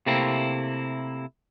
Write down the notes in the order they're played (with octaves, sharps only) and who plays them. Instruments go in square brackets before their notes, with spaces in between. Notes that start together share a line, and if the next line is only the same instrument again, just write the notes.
[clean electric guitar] C3 A3 A#3 C4 E4